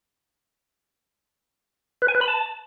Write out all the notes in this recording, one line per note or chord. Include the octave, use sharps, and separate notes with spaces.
B4
G#5
B4
B5
A5